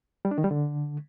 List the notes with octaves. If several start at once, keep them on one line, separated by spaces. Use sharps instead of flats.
G3
D4
D#3
G3
D3